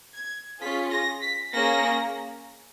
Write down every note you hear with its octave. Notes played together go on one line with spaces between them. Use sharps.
G#6
C#4 F4 G#4 B6
A#6
B6
A#3 C#4 G#4 A#6